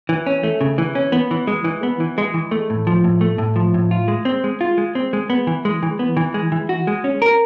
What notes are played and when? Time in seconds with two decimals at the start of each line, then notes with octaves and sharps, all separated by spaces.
0.09 E3
0.26 C#4
0.43 A3
0.61 C#3
0.78 E3
0.95 C#4
1.12 B3
1.31 E3
1.47 G#3
1.64 E3
1.83 B3
2.00 E3
2.18 G#3
2.34 E3
2.51 A3
2.70 A2
2.87 F3
3.04 A2
3.21 A3
3.38 A2
3.56 F3
3.74 A2
3.91 F4
4.08 G#3
4.25 C4
4.44 G#3
4.61 F4
4.78 G#3
4.95 C4
5.13 G#3
5.30 B3
5.47 E3
5.65 G#3
5.83 E3
5.99 B3
6.17 E3
6.34 G#3
6.52 E3
6.69 F#4
6.87 G#3
7.04 C#4
7.22 A#4